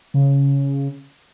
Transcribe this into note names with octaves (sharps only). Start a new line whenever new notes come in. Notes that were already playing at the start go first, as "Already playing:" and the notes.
C#3